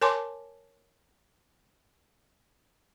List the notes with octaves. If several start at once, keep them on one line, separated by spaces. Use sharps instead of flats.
A#4 C#5 G#5 A5 C6 D6